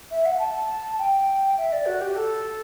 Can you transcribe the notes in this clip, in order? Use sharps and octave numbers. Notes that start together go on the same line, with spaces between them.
E5
F#5
A5
G5
E5
D5
F#4
G4
A4